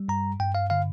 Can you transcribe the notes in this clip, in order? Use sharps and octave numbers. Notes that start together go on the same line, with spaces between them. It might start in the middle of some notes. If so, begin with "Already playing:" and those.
Already playing: G3
G2 A#5
G2 G5
F5
D3 F5